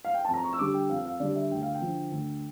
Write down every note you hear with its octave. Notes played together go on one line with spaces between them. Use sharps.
F5
G5
F2 A5
A#5
C#6
E6
D3 G3 D6
G5
F2 F5
F5
D3 G3 D5
E5
D2 G5
F5
G5
D3 F3
D2